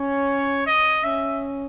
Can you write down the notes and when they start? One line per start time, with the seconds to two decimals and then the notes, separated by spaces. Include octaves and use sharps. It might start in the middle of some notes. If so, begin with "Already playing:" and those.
Already playing: C#4 C#5
0.67 D#5
1.04 C#4 E5